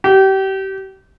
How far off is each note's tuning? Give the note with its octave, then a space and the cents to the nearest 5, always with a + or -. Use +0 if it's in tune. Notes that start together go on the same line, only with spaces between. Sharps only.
G4 -30